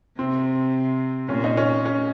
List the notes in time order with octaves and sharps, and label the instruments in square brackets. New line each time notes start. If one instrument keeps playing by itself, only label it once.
[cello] C3 [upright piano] C4
[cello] A#2 [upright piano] C#4
[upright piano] D#4
C#4
C#4